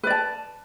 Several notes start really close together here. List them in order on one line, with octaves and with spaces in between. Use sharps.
B4 D5 A5